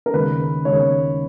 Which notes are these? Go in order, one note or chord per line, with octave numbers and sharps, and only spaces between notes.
A#4
D#2 C#3 G#3 B4
D#2 C#3 G#3 C#5